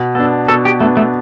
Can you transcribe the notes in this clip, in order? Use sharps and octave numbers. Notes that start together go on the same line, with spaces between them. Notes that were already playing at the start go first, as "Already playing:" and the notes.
Already playing: B2
B3 D4 A4
B2 A4
G4
A3 B3 D4
A3